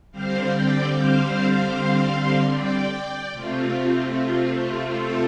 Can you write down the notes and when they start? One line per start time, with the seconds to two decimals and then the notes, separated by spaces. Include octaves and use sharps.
0.12 D3 G3 C4 C5 F5
0.52 D5 G5
0.91 C5 F5
2.52 D5 G5
3.32 C3 A3 C4 F4
4.12 F4
4.53 F4
4.92 F4 A4